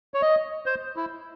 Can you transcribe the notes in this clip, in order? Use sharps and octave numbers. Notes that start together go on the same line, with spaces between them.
C#5
D#5
C5
E4